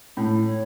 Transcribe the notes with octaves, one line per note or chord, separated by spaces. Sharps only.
A2
C#5